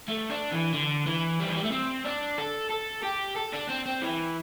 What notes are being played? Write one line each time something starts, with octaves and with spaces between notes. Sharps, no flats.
A3
D4
E3
D3
E3
G3
E3
G3
A3
C4
D4
A4
A4
G4
A4
D4
C4
C4
E3